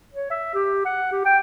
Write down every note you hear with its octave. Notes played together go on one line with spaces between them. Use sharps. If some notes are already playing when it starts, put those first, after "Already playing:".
C#5
E5
G4
F#5
G4
G5